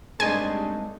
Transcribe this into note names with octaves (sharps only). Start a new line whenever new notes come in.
G2 G#3 A3 C4 D4 D#4 G#5